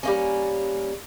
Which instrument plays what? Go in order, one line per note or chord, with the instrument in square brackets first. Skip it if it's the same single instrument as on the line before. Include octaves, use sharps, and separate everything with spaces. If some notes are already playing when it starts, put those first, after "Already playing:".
[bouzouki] G3 A#3 C#4